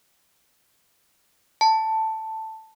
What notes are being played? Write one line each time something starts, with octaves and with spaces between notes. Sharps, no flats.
A5